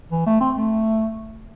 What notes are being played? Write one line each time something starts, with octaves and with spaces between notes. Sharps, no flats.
E3
A3
C4
A3